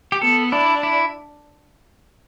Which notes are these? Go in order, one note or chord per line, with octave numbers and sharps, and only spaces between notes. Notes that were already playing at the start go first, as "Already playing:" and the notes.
G4
B3 A4
D4 E4
E4